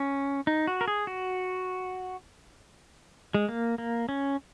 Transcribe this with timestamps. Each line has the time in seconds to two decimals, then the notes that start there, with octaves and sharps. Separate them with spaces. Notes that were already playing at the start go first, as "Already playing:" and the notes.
Already playing: C#4
0.47 D#4
0.67 F#4
0.81 A#4
0.88 G#4
1.07 F#4
3.34 G#3
3.49 A#3
3.78 A#3
4.09 C#4